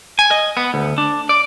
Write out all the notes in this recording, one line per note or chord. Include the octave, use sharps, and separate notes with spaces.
G#5
D#5
B3
D2
D4
D5